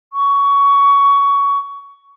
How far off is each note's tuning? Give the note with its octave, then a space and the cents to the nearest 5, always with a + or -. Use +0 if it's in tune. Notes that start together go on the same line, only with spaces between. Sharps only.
C#6 +20